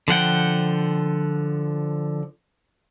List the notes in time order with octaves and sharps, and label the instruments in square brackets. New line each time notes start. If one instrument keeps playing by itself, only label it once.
[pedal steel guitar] D3 F3 F#5 G5